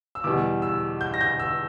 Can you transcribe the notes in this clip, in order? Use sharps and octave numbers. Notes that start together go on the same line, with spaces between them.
E6
E2 B2 G3 D6
E6
G6
A#6
G6
E6